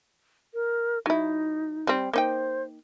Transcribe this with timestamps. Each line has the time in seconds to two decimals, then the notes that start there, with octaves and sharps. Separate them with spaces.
0.54 A#4
1.06 F#3 D#4 E4
1.87 G3 C4
2.13 A#3 D#4 C5 G5